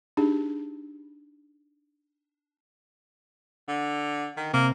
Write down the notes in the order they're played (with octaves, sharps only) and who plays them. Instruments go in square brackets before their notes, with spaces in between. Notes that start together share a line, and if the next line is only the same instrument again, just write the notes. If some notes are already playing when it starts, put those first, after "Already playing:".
[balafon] D4 D#4 G4 G#4
[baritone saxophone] D3
D#3
[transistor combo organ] C3 [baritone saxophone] A#3